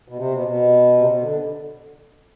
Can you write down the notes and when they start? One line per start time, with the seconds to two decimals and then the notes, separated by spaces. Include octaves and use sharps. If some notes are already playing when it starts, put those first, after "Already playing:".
0.08 B2
0.17 C3
0.33 B2
0.47 B2
0.99 C3
1.07 B2
1.21 D3